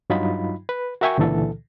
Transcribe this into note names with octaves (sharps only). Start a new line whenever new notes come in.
G2 F#3 D#4 F4 B5
B4
F#4 A#4 E5 G5 G#5 C#6
C#2 A#2 D3 E3 A4